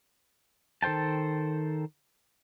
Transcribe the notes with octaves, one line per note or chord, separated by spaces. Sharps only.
D#3 A4 C5 G5 A5